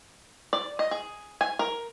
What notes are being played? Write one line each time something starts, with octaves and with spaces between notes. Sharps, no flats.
D5
D#5
G#4
G#5
A#4